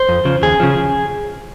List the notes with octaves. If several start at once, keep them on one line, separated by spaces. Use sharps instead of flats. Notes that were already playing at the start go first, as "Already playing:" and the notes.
Already playing: C5
F2
C#3 F3
D#2 G#4
C#3 F3